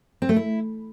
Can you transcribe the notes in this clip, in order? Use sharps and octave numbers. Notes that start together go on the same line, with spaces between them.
C4
A3
E4